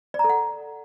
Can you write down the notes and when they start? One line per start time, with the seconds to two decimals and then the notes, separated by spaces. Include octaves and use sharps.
0.14 D5
0.19 A#5
0.24 A4
0.29 F#5